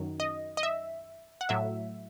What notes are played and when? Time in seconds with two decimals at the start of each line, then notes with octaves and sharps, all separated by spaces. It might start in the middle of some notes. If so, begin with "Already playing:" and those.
Already playing: F#2 D#3 F#3
0.20 D#5
0.57 D#5
0.63 E5
1.41 F#5
1.49 A2 F#3 E5